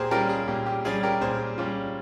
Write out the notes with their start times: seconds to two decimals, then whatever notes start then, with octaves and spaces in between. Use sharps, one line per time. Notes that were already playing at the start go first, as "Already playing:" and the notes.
Already playing: A#2 G4 G#4 A#4 C5
0.11 G3 C#4 F4 G4 A#4
0.29 G#4
0.48 A#2 G4
0.66 G4
0.85 G3 C#4 F4 G#4
1.03 G4 A#4
1.21 A#2 G#4 C5
1.58 G3 C#4 F4